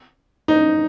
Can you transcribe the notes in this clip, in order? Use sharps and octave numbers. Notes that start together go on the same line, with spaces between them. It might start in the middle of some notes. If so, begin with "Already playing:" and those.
D#4